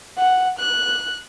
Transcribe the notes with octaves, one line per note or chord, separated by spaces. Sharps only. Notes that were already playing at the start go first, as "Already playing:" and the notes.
F#5
F#6